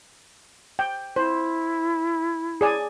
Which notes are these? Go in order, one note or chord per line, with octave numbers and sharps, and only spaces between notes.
G5
E4 C5
G#4 D5 G#5